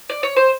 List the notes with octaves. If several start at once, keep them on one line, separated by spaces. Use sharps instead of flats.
D5
C#5
C5